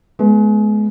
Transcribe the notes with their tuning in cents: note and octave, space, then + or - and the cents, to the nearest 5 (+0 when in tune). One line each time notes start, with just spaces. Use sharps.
G#3 +35 B3 +0